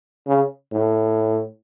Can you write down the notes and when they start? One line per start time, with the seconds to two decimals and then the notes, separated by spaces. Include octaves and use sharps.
0.27 C#3
0.72 A2